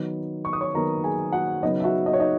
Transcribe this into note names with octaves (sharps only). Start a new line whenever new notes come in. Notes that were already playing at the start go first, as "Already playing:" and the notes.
Already playing: D#3 F#3 B3 D#4
C#6
D#6
C#5 C#6
D#3 F#3 B3 D#4 A#4 A#5
G#4 G#5
F#4 F#5
C#3 F#3 B3 D#4 D#5
E5
F#4 F#5
D#5
C#5
D#4 D#5